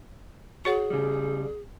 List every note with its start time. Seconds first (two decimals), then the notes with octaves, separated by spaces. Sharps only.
0.65 F#4 G#4 C#5 F#5
0.90 C#3 G3